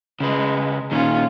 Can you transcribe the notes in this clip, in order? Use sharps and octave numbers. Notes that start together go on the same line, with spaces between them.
C#3 G#3 B4
A#2 D#3 C#4 F4